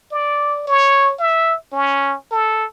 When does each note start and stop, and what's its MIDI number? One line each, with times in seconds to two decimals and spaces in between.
0.12 0.62 74
0.67 1.13 73
1.19 1.55 76
1.72 2.15 61
2.31 2.65 69